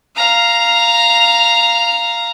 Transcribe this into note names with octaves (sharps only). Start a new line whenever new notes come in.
F5 A#5